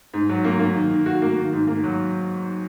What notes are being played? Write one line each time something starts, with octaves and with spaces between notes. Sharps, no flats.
G#2
F#3
A#3
A#3
D#3
D#3
F#4
A#3
D#3
G#2
A#3
F#3